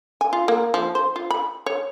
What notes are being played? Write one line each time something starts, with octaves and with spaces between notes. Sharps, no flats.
G#5
F4
A#3
F3
C5
F4
B5
C#5